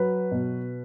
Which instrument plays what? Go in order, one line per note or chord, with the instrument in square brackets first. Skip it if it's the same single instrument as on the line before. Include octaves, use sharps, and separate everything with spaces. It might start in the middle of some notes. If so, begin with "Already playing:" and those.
Already playing: [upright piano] F#3 B4
B2